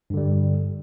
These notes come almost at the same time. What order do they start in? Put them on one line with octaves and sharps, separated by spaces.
G2 D3 G3